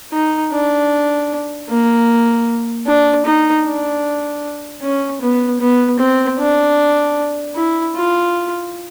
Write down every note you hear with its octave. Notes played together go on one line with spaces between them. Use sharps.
D#4
D4
A#3
D4
D#4
D4
C#4
B3
B3
C4
D4
E4
F4